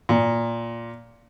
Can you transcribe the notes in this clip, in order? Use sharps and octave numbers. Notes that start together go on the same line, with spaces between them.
A#2